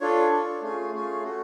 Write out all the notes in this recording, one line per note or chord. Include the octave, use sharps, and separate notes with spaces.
D4 F4 A4 C#5
D4 F4 A4
A3 C#4 F4 G#4
A3 C#4 F4 G#4
A3 C#4 F#4 A4